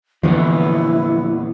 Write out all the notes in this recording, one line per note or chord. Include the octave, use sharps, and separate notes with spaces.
E2 A#2 D3 E3 F3 B3 E4